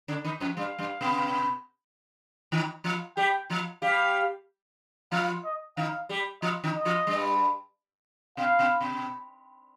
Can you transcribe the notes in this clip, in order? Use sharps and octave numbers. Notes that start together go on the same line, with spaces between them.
D3 D4
D#3 D#4
F2 F3
G2 G3 F5
G2 G3
B2 B3
D#3 D#4
F3 F4
G3 G4 G5
F3 F4
G3 G4 F5
F3 F4 F5
D#5
D#3 D#4 F5
G3 G4
F3 F4 D#5
D#3 D#4
D#5
F3 F4
G2 G3
B2 F5
B2
B2